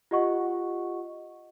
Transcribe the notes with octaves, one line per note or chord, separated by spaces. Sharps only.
F4 G4 D#5 F#5 C#6